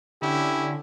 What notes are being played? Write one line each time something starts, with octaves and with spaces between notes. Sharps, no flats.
D3 C#4 E4 G4